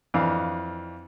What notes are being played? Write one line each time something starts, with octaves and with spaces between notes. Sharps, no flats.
F2 E3 D4 F5